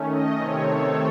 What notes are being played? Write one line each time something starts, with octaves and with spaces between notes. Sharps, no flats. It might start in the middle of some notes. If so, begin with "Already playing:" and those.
Already playing: D#3 A3 C#4
D#5
C3 D#3 A3 C4 C#5
A4